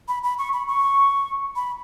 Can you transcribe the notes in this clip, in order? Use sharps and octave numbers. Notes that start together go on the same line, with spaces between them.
B5
B5
C#6
B5
C#6
B5